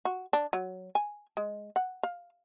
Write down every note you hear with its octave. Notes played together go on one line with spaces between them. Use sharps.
F#4
D4
F#3
G#5
G#3
F#5
F5